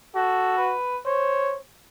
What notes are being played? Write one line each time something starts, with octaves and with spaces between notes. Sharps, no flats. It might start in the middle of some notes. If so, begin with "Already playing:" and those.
F#4 A4
B4
C5 C#5